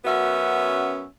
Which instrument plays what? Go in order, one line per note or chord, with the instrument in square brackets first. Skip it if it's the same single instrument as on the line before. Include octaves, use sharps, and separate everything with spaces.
[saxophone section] F#2 B3 C#4 F#4 E5